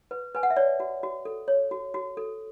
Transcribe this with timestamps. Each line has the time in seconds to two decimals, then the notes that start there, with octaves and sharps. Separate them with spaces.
0.11 B4
0.35 B4 G#5
0.43 F#5
0.50 E5
0.57 C#5 D5
0.80 F#4
1.03 F#4
1.25 A4
1.48 C#5
1.71 F#4
1.94 F#4
2.17 A4